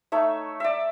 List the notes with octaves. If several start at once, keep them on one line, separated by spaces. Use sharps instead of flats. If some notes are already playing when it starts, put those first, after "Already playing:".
A3 D#4 C#5 E5
D5 E5